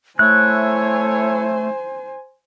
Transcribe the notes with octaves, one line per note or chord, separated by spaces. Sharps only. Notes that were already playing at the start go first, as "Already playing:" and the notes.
A3 E4 C5 C#5 G#5 F#6